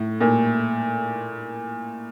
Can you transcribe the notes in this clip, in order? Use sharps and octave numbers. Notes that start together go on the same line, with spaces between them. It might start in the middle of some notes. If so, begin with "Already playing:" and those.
Already playing: A2
A#2